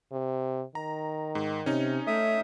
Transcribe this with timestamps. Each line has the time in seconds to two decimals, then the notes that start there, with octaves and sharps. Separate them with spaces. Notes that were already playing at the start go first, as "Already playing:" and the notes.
0.12 C3
0.75 D#3 A#5
1.35 G#2
1.66 C3 C#4 D#4
2.07 A3 E5 D#6